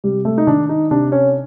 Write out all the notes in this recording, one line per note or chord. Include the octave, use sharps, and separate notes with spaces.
C3 G3
A3
D#4
D#3 D4
D#4
C3 D4
C#4